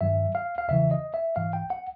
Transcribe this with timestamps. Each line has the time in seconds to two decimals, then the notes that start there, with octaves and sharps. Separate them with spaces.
0.01 G2 D#3 F#3 E5
0.35 F5
0.58 F5
0.68 E2 C#3 E3 E5
0.91 D#5
1.14 E5
1.36 G#2 E3 F5
1.53 G5
1.70 F#5